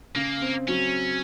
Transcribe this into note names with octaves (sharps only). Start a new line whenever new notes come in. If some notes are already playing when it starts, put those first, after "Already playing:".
C#3 A#3
C4
F#3 C#4